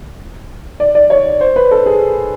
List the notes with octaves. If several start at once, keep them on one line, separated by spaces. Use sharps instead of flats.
D5
D5
C#5
C5
B4
A4
G#4